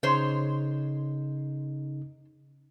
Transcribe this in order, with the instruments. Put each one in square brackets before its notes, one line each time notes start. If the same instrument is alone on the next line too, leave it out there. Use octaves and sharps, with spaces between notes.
[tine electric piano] C#3 D#4 [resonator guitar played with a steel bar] C5 C#5